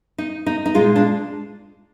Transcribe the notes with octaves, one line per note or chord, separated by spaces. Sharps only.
D#4
D#4
D#4
A#2 G#3 F4
D4